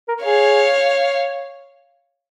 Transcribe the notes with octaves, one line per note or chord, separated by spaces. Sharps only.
A#4
G#4 C#5 F5